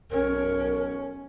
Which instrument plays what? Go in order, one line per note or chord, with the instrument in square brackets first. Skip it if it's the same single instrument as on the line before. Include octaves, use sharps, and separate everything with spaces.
[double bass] B1 C#4 [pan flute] A#4